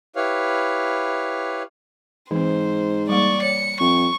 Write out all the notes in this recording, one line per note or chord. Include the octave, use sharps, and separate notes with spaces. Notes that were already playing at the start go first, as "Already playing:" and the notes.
E4 G4 B4 C#5 F5
G#2 E3 C4 C5
G3 A#3 D5 C#6
C#5 C#7
F2 C#6